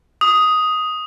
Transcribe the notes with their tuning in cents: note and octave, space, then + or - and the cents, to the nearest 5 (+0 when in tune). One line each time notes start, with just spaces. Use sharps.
D#6 +5